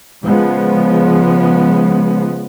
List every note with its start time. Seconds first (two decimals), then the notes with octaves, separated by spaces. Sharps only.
0.24 C#3 F3 G#3 B3